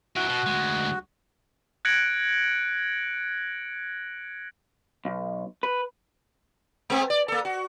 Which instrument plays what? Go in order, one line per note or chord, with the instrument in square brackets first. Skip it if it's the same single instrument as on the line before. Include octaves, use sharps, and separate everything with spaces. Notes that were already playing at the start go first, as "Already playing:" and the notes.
[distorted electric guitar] E3 F#3 [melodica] F#4
[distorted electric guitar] B2
D2 G#3
[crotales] F#6 G#6 A#6 C#7 D7 F#7
[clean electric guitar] B1
B4
[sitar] G#3 B3 C4
D5
A#3 A4
F#4